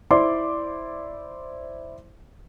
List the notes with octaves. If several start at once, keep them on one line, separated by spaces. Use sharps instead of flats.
E4 C5 D5 C6 D6